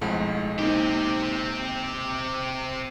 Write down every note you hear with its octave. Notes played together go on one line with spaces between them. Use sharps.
B1 F2 A2 G#3 F#5
A#3 C4 D#4 G4